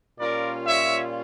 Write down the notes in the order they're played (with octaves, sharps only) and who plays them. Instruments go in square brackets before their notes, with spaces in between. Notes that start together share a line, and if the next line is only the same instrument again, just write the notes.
[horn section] A#2 G3 C#4 F4 A#4 D5
C#5 E5